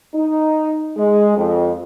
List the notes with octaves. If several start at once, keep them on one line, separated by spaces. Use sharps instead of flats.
D#4
G#3
F2